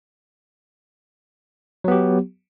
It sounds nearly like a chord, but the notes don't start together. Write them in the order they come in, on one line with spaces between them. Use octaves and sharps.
F#3 B3 G4